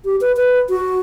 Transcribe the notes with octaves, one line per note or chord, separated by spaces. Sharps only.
G4
B4
B4
F#4